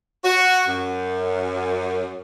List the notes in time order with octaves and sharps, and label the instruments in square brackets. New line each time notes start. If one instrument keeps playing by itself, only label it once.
[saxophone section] F#4
F#2